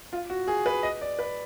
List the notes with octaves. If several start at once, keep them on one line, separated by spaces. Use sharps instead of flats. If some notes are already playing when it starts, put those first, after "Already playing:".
F4
F#4
G#4
B4
D#5
D5
B4